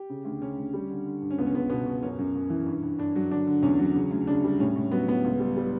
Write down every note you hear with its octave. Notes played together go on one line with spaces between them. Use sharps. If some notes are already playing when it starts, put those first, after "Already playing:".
Already playing: G4
C#3
D2
C#3 C#4
D2
G3
D3
D3
G2
C#4
C#2 B3
C#4
C#2 B3
B2 B3
B2
F#2 C#4
F#2
F#2
E3
G2
G2
G2 D4
F#3
D3 D4
D3
E2 C#4
F#3
C#3
D2
C#3 D4
G3
A2 C#4
A2
F#3 B3
A2 B3
C#2
G3
G3